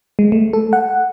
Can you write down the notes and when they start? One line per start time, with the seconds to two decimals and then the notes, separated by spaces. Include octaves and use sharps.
0.19 G#3
0.32 A3
0.53 A4
0.73 F#5